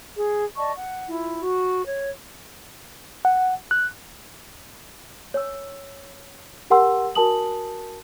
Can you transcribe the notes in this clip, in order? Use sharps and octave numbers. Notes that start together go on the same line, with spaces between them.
G#4
D5 D#5 A5 C#6
F#5
E4 F4
F#4
C#5
F#5
F#6
C#5 G#5 E6
G4 A#4 F#5 G#5 C6 E6
F#4 A#4 G#5 A5 D#6 F#7